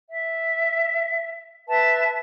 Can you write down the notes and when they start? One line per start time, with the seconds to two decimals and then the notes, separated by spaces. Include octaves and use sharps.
0.09 E5
1.68 B4 E5 A5